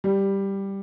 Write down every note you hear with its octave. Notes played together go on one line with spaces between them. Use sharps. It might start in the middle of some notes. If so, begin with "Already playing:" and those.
G3